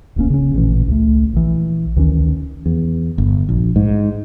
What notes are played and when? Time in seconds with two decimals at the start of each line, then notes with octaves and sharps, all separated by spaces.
0.16 D1 C2 A#3 C#4
0.30 C#3 C#4
0.55 A1 A#2 E3
0.88 C#2 A3
1.34 A#1 E3
1.96 D2 D#3 E3 C#4
2.66 E2
3.18 G1
3.49 A#1
3.76 G#2